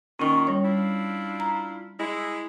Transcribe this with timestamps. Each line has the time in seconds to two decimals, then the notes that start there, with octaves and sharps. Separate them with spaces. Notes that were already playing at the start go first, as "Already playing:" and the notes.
0.19 A#2 D#3 C#4 C#6
0.47 G3 C#5
0.64 D4 E4 F4
1.40 A#5
1.99 G#3 E4